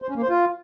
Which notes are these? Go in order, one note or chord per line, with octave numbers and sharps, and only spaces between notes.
C5
C#4
A#3
C5
F4